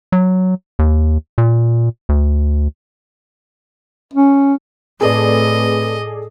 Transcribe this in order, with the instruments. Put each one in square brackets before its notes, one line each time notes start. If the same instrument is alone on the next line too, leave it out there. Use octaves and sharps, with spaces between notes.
[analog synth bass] F#3
D#2
A#2
D2
[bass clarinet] C#4
[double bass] A2 [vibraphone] A3 C4 B4 [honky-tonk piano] G#4 A4 D5 [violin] D#5